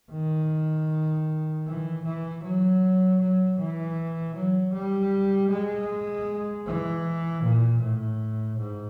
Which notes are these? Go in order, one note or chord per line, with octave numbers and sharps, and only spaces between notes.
D#3
E3
E3
F#3
F#3
E3
F#3
G3
G#3
E3
A#2
A2
G#2